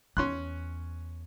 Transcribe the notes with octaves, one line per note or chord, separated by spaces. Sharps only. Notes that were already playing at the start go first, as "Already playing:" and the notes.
E2 C#4 C6 F#6